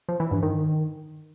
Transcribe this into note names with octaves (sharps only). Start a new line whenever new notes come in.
F3
E3
G2
D#3